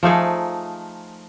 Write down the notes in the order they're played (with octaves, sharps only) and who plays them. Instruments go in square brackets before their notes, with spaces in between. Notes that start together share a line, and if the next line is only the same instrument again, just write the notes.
[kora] F3 A3 D#4 G#4